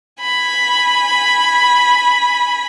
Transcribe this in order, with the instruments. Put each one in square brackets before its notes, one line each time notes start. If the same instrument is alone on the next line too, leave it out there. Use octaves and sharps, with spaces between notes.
[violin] G#5 B5